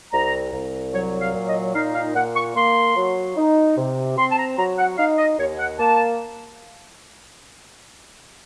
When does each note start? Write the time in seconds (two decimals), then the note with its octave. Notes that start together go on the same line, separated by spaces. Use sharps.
0.13 C2 A#5
0.53 C2
0.93 F#3 C#5
1.20 F5
1.34 A#2
1.48 D#5
1.74 D#4 F5
1.95 F5
2.15 A#2 F#5
2.35 C#6
2.56 A#3 C6
2.96 F#3
3.36 D#4
3.77 C3
4.18 C4 C6
4.31 A5
4.38 A#5
4.58 F#3 A#5
4.78 F#5
4.98 D#4 F5
5.18 D#5
5.39 D#2 C#5
5.59 F#5
5.79 A#3 A5